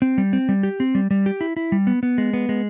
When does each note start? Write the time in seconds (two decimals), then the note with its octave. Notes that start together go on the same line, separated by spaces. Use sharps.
0.02 C4
0.18 G3
0.33 C4
0.49 G3
0.63 G4
0.80 C4
0.95 G3
1.11 G3
1.26 G4
1.41 E4
1.57 E4
1.72 G3
1.87 B3
2.03 B3
2.18 G#3
2.33 B3
2.49 G#3